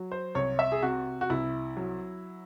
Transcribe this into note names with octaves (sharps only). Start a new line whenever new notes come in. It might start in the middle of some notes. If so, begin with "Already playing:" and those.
Already playing: F#3
C5
C2 C#5
E5
G#4
C3 F#4
F#4
C2 E4
F#3